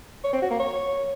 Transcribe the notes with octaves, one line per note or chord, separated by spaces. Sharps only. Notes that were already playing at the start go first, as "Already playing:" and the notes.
C#5
C4
F#4
A#3
C#5